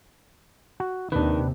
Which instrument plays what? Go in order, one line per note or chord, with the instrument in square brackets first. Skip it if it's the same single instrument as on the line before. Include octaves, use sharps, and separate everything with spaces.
[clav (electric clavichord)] F#4
[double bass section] D#2 C3 [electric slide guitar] D#3 [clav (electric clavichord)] D4 B4